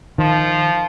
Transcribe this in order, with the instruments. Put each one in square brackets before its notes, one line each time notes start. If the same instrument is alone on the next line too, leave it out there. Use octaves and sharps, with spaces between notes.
[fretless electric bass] D#3 [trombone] F3